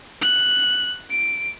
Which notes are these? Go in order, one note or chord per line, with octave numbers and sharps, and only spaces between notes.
F#6
D7